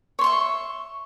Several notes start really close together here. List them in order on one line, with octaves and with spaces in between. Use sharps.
C#5 C6 C#6 E5